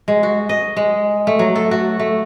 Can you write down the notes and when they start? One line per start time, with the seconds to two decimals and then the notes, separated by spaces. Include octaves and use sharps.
0.08 G#3
0.23 F#4
0.49 D#5
0.77 G#3
1.27 A3
1.39 F#3
1.56 A4
1.71 F#4
1.99 A3